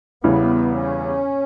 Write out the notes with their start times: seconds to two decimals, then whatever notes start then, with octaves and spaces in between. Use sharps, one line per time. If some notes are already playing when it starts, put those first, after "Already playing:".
0.23 E2 C#3 E3 G3 B3
0.78 C#4